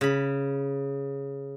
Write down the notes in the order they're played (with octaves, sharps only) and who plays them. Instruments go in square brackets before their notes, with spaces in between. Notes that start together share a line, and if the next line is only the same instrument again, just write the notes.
[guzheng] C#3 B5